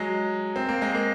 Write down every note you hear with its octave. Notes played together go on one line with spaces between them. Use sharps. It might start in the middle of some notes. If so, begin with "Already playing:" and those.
Already playing: F#3 G#3
C4
A#3
G#3
A#3